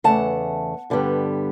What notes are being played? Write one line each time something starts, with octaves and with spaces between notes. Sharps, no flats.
E2 C#3 E3 A3 F#5 A5
G2 D3 G3 B3